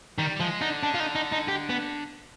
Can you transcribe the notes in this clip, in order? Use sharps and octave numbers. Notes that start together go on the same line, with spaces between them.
D#3 G3
G3
F3 G#3
D3 D#4
D4
F4
D#4
D#4
D#4
G4
B3